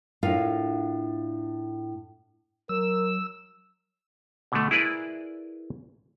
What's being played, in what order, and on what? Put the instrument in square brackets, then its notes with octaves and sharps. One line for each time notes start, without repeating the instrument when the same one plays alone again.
[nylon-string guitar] A2 D4 F4 A#4 F5
[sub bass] F#3 [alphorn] A#4 [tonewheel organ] E6
[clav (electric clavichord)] B2 D3 A3
E4 G#4 A#4 B4 D5